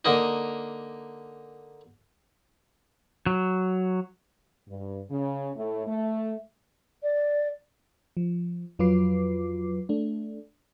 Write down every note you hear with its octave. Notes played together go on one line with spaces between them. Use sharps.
D3 A#3 D#4
F#3
G2
C#3
A2
A3
D5
F3
F2 F#3 F4 B4 D6 C7
A3 D4